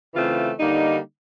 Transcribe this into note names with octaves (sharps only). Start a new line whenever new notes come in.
C#3 E3 A3 C4 F4
D3 G3 A#3 D#4